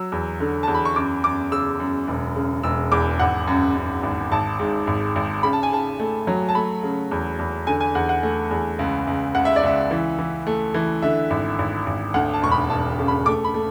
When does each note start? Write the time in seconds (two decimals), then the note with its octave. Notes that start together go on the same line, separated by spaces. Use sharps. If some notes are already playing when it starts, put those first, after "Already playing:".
Already playing: F#3 E6
0.12 E2
0.40 D3
0.63 E2 A5
0.74 B5
0.85 C#6
0.96 F#2 D6
1.24 F#2 D6
1.52 C#3 E6
1.80 F#2
2.08 E1
2.36 C#3
2.63 E1 E6
2.92 E2 D6
3.19 G#1 F#5
3.47 F#2
3.75 F#2
4.03 G#1
4.31 G#1 A5
4.59 G#2
4.87 G#1
5.16 G#1
5.43 C#3 B5
5.53 A5
5.63 G#5
5.71 C#3 A5
6.00 A3
6.27 F#3
6.49 A5
6.55 A3 B5
6.83 C#3
7.11 E2
7.39 E2
7.67 D3 G#5
7.80 G#5
7.95 E2 F#5
8.09 F#5
8.23 A3
8.51 E2
8.79 C#2
9.07 C#2
9.35 C#2 F#5
9.45 E5
9.56 D5
9.63 C#2 E5
9.91 E3
10.18 E3
10.47 A3
10.74 E3
11.02 D3 E5
11.30 G#1
11.59 G#1
11.86 G#1
12.14 D2 F#5
12.34 A5
12.42 E1 C#6
12.52 B5
12.70 E1 A5
12.99 C#3
13.08 B5
13.26 A3 D6
13.44 B5
13.54 A3